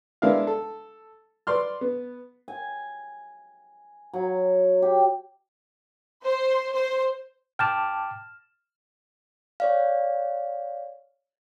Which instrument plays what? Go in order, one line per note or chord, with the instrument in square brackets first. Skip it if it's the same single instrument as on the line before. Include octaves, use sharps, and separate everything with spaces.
[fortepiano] G#3 B3 D4 E4 A#4 F5
A4
B4 D5 C6 F6
B3
[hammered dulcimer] G#5
F#3
G4
[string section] C5
C5
[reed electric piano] G5 A5 D6 [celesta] F6 E7
[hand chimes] C#5 D5 F5